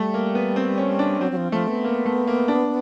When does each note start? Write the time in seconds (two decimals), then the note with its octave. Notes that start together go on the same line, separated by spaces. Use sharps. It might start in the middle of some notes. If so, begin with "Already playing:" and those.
Already playing: G3 A3
0.14 A#3
0.35 B3
0.56 C4
0.78 C#4
0.99 D4
1.20 F#3 C4
1.32 F#3
1.37 F3
1.52 F3 A3
1.68 B3
1.84 A#3
2.06 A3
2.27 A#3
2.48 D4